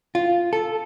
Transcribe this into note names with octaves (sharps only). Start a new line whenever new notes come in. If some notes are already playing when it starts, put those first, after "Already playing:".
F4
A4